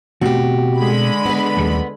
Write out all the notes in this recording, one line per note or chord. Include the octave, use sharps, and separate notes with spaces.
B2 A3 C4 F#4 G4
D3 G#3 B5
B3 B4
D#2 G3 A3